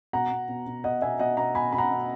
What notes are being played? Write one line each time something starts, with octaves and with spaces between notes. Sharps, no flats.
B2 F#5 A#5
B2
B2
B2
B2 D#5 F#5
B2 E5 G#5
B2 D#5 F#5
B2 F#5 A#5
B2 G#5 B5
B2 B5
F#5 A#5
B2